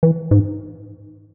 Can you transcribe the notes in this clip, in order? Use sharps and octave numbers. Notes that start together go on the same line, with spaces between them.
E3
G#2